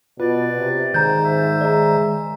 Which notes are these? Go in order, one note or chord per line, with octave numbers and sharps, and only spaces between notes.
B2 F4 B4 D5
C3
G#2 D#3 C5 A#5 G6
E5
G#3 D5 A#5